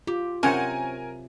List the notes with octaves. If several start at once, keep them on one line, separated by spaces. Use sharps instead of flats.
F4 G4
C3 F#3 C#4 A#4 C5 F#5 G#5